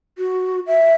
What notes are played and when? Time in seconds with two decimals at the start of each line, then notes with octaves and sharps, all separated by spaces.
0.18 F#4
0.67 E5